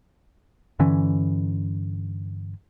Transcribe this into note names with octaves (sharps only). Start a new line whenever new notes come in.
G2 D3 E3 C#4